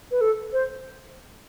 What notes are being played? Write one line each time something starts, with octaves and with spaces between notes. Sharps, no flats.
B4
A4
C5